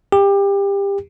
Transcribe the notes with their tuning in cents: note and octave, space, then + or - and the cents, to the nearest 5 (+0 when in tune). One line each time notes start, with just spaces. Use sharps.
G4 +25